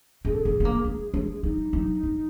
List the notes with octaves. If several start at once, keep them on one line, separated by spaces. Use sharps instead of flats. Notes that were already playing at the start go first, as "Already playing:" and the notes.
C4 G#4
A4
B3 G#4
B3
A#3
G#3
G#3
G3 D#4
F#3
F3